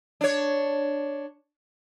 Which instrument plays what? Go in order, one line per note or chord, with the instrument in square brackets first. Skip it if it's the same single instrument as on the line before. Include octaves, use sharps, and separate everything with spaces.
[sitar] D4 C#5